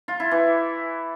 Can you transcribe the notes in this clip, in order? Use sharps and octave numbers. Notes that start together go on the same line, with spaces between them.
F4
E4
E3